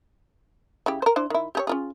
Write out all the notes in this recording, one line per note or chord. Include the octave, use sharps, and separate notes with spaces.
C#3 E4 G4
A#4 C5
D4 E4 C5
D#3 E4
G4 G#4 C#5
C#4 F4 G#4